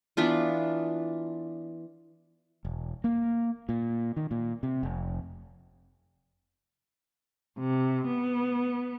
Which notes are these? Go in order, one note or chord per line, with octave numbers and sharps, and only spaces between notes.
E3 B3 D4 F4
E1
A#3
A#2
D#3
A#2
C3
F1
C3
B3